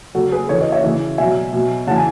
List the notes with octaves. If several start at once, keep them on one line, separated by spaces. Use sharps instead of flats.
C#3 F#3 F#4 A4
G#4 B4
C#3 E3 A4 C#5
B4 D#5
C#5 E5
C#3 E3
B2 F#3 E5 G#5
B2 F#3
C#3 E3 F#5 G#5 A5